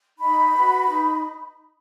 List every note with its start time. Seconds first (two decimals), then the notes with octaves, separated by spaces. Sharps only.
0.19 D#4 B5
0.54 F#4 B4
0.89 D#4